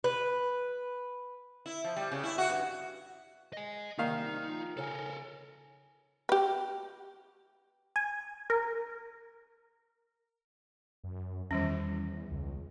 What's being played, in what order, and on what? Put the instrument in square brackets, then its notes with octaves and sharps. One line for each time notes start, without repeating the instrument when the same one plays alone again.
[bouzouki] B4
[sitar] E4
F3
G3
C#3
E4
F#4
G2
[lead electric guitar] D#5 G#5
[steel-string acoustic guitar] C3 G3 A#3 [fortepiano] D#3 F5 [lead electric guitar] D#4
[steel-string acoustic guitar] F3
[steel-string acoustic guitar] C#3 C#5 G#5 [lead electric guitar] A4 A#4
[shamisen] G4 B4
[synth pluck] G#5
A#4
[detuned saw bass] F#2
[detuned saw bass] E2 [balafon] D#3 G3 C#4
[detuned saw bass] C#2